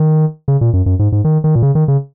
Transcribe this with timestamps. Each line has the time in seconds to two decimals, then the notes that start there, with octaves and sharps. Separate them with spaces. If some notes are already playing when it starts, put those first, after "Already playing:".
Already playing: D#3
0.48 C#3
0.61 A#2
0.73 F#2
0.86 F#2
0.99 G#2
1.12 G#2
1.24 D#3
1.44 D#3
1.55 A#2
1.62 C#3
1.75 D#3
1.88 C#3